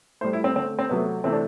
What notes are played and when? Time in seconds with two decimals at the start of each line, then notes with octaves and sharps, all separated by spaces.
0.21 A2 G3 C5
0.33 E4
0.44 C4
0.56 D3 C4
0.59 A3
0.79 C4
0.90 C3 F#3 A3 B3
1.24 C3 E3 A3 C4
1.32 D4